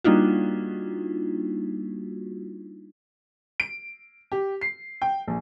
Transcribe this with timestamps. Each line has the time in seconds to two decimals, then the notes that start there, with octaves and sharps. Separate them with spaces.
0.04 G3 A#3 D4 D#4 F4 F#4
3.60 D7
4.32 G4
4.61 C7
5.02 G5
5.28 A#1